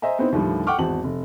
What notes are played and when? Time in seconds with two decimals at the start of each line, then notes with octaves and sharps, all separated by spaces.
0.02 C5 D#5 E5 G#5 A#5
0.19 B3 C4 D#4 E4 C5
0.32 D#2 A2 D3 F3 G3 A3
0.67 F#5 G5 C#6 D6 F6
0.78 G#1 E2 F#4 A5 F#7
1.04 F1